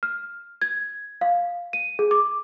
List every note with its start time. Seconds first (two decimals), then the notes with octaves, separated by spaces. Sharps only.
0.03 F6
0.62 G#6
1.21 F5
1.73 D#7
1.99 G#4
2.11 D6